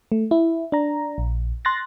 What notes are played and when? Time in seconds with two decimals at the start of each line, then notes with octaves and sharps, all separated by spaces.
0.12 A3
0.31 E4
0.72 D4 A#5
1.18 A#1
1.65 C6 F#6 A6 A#6